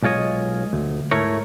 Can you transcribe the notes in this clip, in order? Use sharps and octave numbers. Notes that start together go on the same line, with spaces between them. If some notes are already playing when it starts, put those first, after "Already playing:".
B1 G#3 F4 C#5 D#5
D2
G#2 A3 E4 A#4 C#5